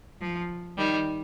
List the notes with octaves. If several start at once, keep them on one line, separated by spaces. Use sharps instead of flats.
F3
D#3 G3